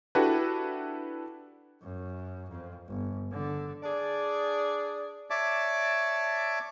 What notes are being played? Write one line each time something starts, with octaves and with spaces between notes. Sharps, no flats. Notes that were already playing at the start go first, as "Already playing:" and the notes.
D4 E4 F#4 G4 A4 B4
F#2
F2
G1
D3
D4 G#4 D5
C#5 D5 E5 A5 D6